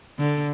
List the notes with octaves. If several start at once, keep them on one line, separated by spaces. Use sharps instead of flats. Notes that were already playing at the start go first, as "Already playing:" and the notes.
D3